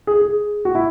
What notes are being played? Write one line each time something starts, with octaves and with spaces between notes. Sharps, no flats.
G#4
G#4
F#4
E4